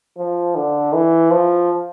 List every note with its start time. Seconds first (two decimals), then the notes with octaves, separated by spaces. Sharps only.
0.18 F3
0.56 D3
0.93 E3
1.31 F3